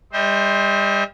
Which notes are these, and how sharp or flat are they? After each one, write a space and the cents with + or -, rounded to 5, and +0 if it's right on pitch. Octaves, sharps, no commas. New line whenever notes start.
G3 +30 C5 +5 E5 -45